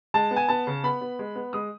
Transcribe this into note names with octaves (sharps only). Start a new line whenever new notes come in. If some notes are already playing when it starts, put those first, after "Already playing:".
G#3 A5
B3
G#5
B3 A5
C#3
B3 B5
B3
G#3
B3
G#3 D#6